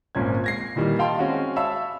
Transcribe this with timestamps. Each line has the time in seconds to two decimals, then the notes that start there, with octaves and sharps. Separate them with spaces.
0.15 G#1 A#2 C#4 G#6
0.44 G#6 A#6 C7
0.76 A#2 D#3 E3 G3
0.99 D#5 F5 G5 A5 C6
1.19 G#3 C4 C#4 F#4
1.56 C#5 E5 F5 A5 B5 E6